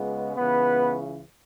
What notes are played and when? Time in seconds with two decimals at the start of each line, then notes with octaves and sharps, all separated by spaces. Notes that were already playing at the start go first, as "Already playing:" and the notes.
Already playing: C#2 C#3 G#3 B3
0.36 C#2 C#3 E3 B3 B4